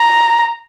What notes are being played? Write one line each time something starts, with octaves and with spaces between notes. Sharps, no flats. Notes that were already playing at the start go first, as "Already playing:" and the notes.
Already playing: A#5